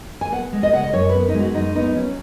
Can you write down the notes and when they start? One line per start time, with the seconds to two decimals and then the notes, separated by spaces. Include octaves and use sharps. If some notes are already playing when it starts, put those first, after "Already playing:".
0.21 G#5
0.32 B3 F#5
0.53 G#3
0.63 D#5
0.73 C#3 F#5
0.84 D#5
0.93 F#2 C#5
1.09 B3 B4
1.29 D#4
1.34 G#3 F#4
1.55 F#2 D#4
1.75 B3 D#4
1.96 F#3 C#4